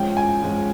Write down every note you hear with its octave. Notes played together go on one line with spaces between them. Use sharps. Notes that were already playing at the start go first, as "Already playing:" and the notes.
Already playing: G#2 F3 G#3 C#4 G5
G#5
G#2 F3 G#3 C#4